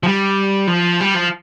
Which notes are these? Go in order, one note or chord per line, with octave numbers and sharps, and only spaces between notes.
F3
G3
F3
G3
F3